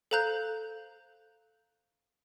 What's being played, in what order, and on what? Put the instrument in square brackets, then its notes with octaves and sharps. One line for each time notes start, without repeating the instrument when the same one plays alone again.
[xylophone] A4 C5 F5 A#5 F#6 G6